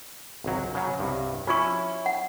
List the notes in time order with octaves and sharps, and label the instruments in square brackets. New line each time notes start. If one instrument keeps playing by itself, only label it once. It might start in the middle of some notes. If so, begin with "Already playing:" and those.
[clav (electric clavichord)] G#1 C#2 F#3
C#3 F#3
C2 G2
[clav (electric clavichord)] C#4 E4 [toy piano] F4 C#6
[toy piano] F#5